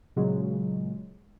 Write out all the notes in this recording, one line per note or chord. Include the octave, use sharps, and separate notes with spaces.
A#2 C#3 F#3 G#3